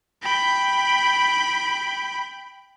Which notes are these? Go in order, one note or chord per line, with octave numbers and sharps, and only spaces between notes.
G5 B5